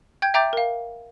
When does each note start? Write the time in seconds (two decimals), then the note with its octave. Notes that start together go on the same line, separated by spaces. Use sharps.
0.22 G5 G6 G#6
0.34 E5 G5 A#5 D6 G6 A6
0.53 A#4 F5